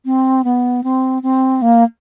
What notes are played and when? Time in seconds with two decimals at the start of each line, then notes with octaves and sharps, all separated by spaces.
0.05 C4
0.44 B3
0.84 C4
1.23 C4
1.62 A#3